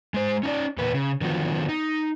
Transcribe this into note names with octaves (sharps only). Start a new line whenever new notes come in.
G#3 C5
C#4 D#4 D5
E2 A#2 A#3 B4
C#3
D3 D#3 F3 F#3 B3 F4
D#4